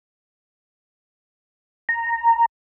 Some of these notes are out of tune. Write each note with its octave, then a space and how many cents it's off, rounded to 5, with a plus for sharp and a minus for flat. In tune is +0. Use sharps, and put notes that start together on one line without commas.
A#5 -10